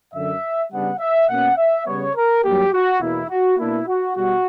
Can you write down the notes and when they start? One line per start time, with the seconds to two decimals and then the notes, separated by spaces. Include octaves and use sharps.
0.13 F#2 D3 F#3 E5
0.71 C#3 G3 B3 D4 F#5
0.99 E5
1.28 B2 A#3 C#4 F#5
1.57 E5
1.86 C#3 G3 B3 C#5
2.15 A#4
2.44 G2 F#3 A#3 G4
2.73 F#4
3.01 E2 B2 A#3 E4
3.30 F#4
3.58 B2 A#3 D4 E4
3.87 F#4
4.16 B2 G3 F#4